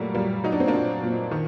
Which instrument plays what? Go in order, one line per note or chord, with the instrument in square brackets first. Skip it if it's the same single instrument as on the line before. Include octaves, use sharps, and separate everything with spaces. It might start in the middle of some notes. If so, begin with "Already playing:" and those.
Already playing: [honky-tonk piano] A#2 F#3 G3 A3 A#3
A#2 G3 A#3
F#3 D#4
D4
C4
A#3 D4
A#2
A#2
D#3